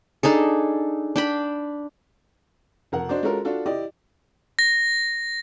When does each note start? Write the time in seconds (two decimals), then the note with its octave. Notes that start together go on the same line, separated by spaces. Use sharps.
0.23 D4 D#4 G#4 A4
1.16 D4 G5 B5
2.92 F1 A#4 F#5
3.09 D4 D#4 F#4 C5 D5
3.23 G#3 C#4 F4 F#4 A4 A#4
3.45 D4 F4 F#4 A4
3.66 E4 G4 D5 D#5
4.59 A#6